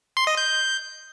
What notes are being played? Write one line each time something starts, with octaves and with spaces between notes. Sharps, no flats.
C6
D#5
G6